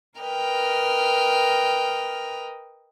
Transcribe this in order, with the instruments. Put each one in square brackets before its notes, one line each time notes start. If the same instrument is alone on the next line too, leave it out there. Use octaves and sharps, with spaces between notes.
[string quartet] A#4 B4 D#5 G5 F6